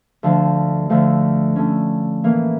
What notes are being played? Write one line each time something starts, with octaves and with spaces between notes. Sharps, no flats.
D2 D3 F3
D2 D3 F3 A3
D3 A3 C#4
A2 E3 A#3